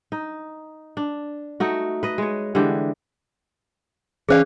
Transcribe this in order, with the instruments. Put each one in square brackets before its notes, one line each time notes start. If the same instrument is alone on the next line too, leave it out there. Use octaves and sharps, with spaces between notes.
[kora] D#4
D4
A3 D#4 F#4
B4 D#5
G#3 C#5
D3 E3 G#3 G4
[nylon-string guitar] E3 C#4 F5 [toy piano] G#4 C5 D5